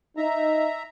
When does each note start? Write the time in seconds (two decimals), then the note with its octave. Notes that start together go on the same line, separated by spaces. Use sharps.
0.17 D#4 E5 A#5